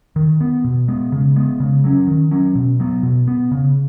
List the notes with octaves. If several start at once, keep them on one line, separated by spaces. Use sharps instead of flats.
D#3
B3
B2
G#3 B3
C#3
G#3 B3
C#3
F#3 C#4
D#3
F#3 C#4
B2
F#3 B3
B2
B3
C#3